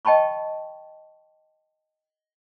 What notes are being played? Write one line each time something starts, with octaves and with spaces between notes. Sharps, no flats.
D#5 G5 A5 B5 C#6